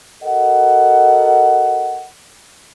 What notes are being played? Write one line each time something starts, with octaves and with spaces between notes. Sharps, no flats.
F#4 A4 A#4 D#5 F#5